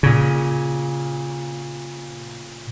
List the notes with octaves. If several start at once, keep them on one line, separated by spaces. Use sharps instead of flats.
A#2 C#3